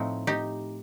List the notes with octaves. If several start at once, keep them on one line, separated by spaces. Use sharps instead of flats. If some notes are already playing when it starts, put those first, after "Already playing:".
Already playing: A2 F3 A3 C4 D#4
D#4 G4